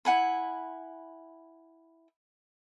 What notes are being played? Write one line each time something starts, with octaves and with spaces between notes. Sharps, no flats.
E4 F#5 G#5 B5